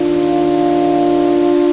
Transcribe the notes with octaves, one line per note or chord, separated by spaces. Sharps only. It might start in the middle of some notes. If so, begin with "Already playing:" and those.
Already playing: D#2 D#3 D4 F4